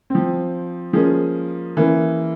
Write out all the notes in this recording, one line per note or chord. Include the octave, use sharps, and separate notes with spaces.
F3 C4
F3 G#3 A#3 C#4 G#4
E3 A#3 C#4